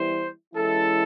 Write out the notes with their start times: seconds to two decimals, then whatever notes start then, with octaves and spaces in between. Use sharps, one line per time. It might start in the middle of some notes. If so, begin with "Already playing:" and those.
Already playing: E3 G3 B3 E4 C5
0.54 E3 G#3 C#4 E4 A4